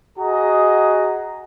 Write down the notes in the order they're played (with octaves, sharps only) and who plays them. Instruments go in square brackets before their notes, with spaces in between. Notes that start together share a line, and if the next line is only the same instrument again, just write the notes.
[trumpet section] F#4 G#4 D#5 A#5